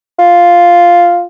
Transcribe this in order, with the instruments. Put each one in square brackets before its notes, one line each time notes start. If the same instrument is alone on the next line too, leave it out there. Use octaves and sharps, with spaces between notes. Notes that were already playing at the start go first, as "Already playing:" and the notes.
[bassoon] F4